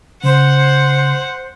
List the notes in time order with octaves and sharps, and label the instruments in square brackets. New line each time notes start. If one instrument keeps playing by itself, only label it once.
[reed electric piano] C#3 [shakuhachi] C5 [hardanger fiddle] F#5